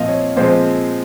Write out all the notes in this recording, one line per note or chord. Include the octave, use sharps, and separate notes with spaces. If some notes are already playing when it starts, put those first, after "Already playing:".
Already playing: A#2 F3 C4 D#5 F5
C#5
A#2 F3 G#3 C4 C5